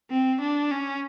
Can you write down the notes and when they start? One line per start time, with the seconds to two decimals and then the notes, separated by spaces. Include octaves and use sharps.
0.11 C4
0.41 D4
0.71 C#4